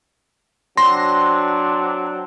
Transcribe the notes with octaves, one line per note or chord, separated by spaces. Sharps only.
F#3 C4 D4 C6 A#6